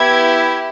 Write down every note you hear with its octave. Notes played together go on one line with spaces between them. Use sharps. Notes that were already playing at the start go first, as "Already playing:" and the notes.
Already playing: B3 E4 G4 G#6